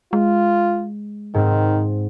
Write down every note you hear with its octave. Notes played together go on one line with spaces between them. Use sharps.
G#3 F4
G#2 D#3 C4